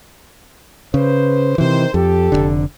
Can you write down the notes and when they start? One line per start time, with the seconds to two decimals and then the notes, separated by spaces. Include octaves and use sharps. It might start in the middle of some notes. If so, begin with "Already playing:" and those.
0.94 C#3 B4 C5
1.58 C3 D#3 E3 C4 C5
1.94 F2 G4 A4
2.32 F1 A#1 D3